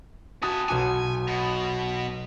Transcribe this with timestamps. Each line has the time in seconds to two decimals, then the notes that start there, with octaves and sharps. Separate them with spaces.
0.43 C3 F#4 G#5 A5 D#6
0.69 B1 F#4 G#5 D6
1.27 B2